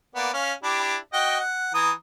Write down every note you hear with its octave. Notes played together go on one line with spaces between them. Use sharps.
A#3 B3 D5
C#4 F5
D4 E4 G4
F#4 D#5 G5
F#5
E3 A#5 D#6